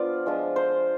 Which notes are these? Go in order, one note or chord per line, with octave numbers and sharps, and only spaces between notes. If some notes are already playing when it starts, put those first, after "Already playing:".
Already playing: F3 B3 D4 F4 D5
F3 G#3 D4 F4
C5